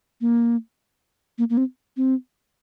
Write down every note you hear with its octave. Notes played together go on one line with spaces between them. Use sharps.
A#3
A#3
A#3
C4
C4